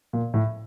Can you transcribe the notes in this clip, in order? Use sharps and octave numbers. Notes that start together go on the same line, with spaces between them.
A#2
A2